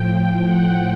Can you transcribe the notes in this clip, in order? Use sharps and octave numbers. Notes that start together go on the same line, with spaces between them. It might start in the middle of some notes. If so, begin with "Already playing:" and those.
Already playing: A2 F3 G5
F#5